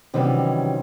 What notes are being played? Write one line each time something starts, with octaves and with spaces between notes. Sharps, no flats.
C3 D#3 E3 F#3 G3 C#4